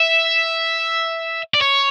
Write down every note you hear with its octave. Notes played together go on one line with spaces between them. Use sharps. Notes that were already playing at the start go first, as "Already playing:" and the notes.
Already playing: E5
D5
C#5